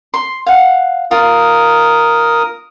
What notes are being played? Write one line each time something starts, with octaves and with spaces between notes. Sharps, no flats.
C6
F5 F#5
F4 A#4 D#6